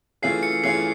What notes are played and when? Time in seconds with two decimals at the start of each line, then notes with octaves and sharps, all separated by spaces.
0.22 E3 A3 C#4 F4 G#4 C7
0.43 C#7
0.64 E3 A3 C#4 F4 G#4 C7